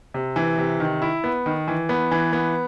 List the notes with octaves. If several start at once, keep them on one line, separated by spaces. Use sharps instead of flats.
C3
E3
C3
D#3
E4
B3
D#3
E3
B3
E3
B3